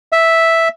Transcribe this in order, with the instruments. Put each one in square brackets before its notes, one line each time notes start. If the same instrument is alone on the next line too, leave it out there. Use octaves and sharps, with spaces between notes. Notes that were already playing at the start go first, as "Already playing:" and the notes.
[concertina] E5